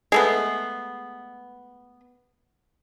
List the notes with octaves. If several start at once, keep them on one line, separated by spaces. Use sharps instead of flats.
G#3 A3 B3